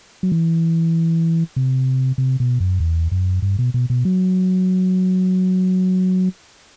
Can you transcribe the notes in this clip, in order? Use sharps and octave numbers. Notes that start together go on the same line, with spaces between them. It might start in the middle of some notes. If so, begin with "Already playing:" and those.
F#3
E3
C3
C3
B2
F#2
E2
F#2
G2
B2
B2
B2
F#3